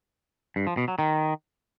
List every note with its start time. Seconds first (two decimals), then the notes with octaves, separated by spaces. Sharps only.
0.56 G2
0.67 F3
0.77 B2
0.88 F#3
0.99 D#3